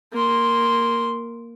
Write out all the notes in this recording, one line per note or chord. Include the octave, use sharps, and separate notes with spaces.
A#3 C6